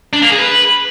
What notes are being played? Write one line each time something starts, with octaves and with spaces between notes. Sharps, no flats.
D4
A#3
G#4
B4